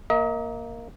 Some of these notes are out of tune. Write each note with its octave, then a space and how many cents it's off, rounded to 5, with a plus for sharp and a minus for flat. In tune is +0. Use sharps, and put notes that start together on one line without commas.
A#3 +0 D#5 +40